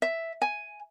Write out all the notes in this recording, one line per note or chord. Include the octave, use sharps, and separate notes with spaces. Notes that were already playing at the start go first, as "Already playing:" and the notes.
E5
G#5